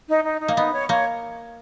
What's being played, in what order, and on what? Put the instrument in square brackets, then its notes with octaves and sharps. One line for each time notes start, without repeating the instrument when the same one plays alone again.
[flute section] D#4
D#4
D#4
[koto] A#3
[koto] B3 [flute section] D#4
[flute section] C#5
[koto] A#3 [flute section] C#5